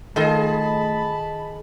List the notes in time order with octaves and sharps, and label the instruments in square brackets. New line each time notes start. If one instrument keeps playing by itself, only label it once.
[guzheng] D#3 F4 A4 [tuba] A3 [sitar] G#4 D#5 [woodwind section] A5 B5